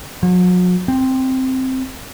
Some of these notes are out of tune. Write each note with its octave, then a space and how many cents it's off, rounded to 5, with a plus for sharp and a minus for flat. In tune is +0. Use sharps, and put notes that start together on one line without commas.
F#3 -40
C4 +0